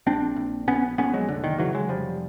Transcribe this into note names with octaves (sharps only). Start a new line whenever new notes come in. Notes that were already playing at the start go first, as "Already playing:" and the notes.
A#1 C4 D4
A#1
A#1 B3 C#4
A#1 B3 C#4
F#3 G#3
F1 D3
D#3
C#3 E3 F#3
F#3 G#3
F1 F3 G3